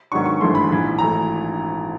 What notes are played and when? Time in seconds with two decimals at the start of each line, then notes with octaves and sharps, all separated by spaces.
0.12 G#2 D#3 F#3 B3 D4 C#6
0.26 C#6
0.40 G#1 G2 E3 A3 C6
0.55 B5
0.69 A#1 G#2 E3
0.98 G#1 E3 A3 A#5